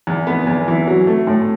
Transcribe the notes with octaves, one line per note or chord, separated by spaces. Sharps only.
E2
B3
E2
E3
F#3
A3
A2